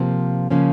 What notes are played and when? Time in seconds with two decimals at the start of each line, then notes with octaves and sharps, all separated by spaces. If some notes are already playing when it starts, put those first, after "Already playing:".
Already playing: C3 F3 A#3
0.50 C#3 F3 A#3 C#4